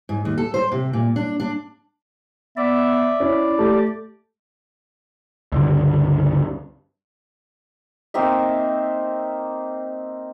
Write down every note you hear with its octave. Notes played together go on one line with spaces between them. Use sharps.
G#2
D#2
A4
C5
C3
A#2
D4
D4
B3 D5 E5
C#4 E4
A3 G4
C#2 G2 D3
A#3 C4 D#4 E5